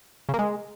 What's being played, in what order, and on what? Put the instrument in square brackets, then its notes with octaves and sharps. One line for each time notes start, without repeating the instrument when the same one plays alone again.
[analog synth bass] C#3
A#3
G#3